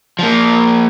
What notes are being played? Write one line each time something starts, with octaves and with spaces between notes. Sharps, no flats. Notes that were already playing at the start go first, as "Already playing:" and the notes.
F3 A#3